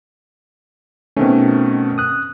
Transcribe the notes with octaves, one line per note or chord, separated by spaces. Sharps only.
B2 D#3 A3 C4 C#4
D#6 F#6